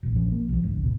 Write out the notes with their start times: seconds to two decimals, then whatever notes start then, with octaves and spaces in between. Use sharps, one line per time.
0.03 E1 A#1
0.16 A#1 F3 C#4
0.32 A#3
0.49 B1 F3
0.63 G#1 D2
0.84 B2